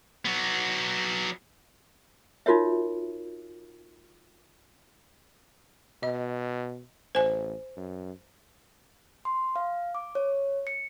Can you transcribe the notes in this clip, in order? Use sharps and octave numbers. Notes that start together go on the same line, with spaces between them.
F#3 B3
D#4 F4 F#4 A#4 C#5 E5
B2 D#5
A1 C5 G#5
F#2
C6
F5
D6
C#5
C#7